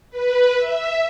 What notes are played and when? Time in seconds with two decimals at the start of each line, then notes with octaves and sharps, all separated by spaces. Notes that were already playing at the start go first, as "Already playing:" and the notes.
0.10 B4
0.54 E5